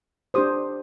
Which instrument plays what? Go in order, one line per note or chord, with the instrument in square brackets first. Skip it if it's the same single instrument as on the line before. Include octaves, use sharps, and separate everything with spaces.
[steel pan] D4 G4 C5 D#6